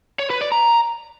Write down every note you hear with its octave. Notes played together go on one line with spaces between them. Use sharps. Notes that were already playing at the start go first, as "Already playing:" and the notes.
C#5
B4
D5
A#5